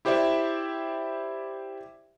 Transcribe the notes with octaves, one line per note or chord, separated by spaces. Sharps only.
E4 G4 C5 D5 E5